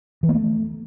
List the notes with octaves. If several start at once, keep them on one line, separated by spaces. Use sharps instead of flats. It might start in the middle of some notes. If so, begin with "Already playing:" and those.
E3
A#3
A3